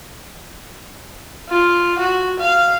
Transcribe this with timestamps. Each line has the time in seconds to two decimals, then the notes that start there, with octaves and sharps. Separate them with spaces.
1.49 F4
1.99 F#4
2.40 F5